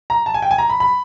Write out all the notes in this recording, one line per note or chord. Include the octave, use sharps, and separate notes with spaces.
A#5
A5
G#5
G5
G#5
A#5
B5
B5